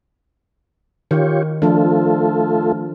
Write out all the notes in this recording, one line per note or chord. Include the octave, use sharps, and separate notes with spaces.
D#3 F4 G4 C#5
F3 A3 D4 F4 A4